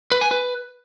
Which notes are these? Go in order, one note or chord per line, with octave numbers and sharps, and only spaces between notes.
B4
G#5
B4